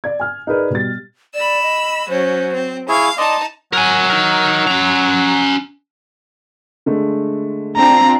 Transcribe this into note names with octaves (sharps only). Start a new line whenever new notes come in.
D5 G#6
G#5 F6
D#4 G#4 A#4 B4 D5
B2 G3 A6
D5 B5 E6
D#5
F#3 C#4 C5
C4
E4 G#4 F5 C#6
D#4 D5 D#5 A5 C6
F#3 A#4 G#5
D#4 A#4
C#4 A#5
D3 G#3 A3
C4 D4 F4 A#5